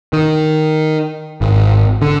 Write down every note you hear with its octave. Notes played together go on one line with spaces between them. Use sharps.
D#3
G#1
D3